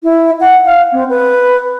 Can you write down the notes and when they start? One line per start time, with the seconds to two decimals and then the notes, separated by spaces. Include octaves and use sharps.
0.03 E4
0.40 F#5
0.65 F5
0.92 C4
1.09 B4